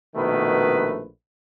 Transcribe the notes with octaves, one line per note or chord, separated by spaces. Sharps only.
A#1 B2 D#3 A3 B4